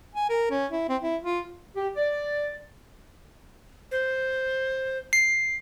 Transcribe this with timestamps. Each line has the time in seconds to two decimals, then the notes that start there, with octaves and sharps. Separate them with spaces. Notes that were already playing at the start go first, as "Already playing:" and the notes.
0.15 G#5
0.29 A#4
0.51 C#4
0.72 E4
0.89 C4
1.02 E4
1.23 F4
1.75 G4
1.96 D5
3.91 C5
5.13 C7